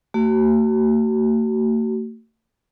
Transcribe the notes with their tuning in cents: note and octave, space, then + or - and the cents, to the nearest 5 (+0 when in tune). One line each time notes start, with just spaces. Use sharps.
A3 +45 F#4 +35